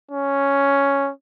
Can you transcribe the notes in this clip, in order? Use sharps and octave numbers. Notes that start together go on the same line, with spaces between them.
C#4